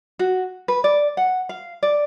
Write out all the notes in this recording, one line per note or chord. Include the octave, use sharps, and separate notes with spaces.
F#4
B4
D5
F#5
F5
D5